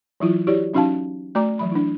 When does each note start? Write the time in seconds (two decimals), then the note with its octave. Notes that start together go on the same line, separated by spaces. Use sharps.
0.20 E3 F#3 E4 F4
0.47 E4 F#4 G4 C#5 D5
0.74 F#3 C#4 D#4 F#4 F5 A5
1.35 A3 F#4 D5 A#5 D6
1.59 E3 F#3 B5
1.72 D4 E4